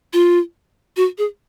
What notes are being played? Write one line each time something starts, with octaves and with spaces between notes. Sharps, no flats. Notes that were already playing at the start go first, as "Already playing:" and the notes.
F4
F#4
G#4